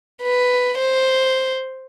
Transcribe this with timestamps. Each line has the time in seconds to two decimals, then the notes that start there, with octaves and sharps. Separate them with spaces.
0.22 B4
0.78 C5